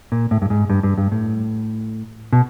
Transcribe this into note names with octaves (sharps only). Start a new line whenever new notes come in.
A#2
A2
G2
G#2
G2
G2
G2
A2
B2